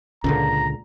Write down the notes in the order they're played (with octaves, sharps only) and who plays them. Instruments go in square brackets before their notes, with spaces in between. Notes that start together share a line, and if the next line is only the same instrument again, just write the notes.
[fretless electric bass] C#2 A#2 D3 [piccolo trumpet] A#5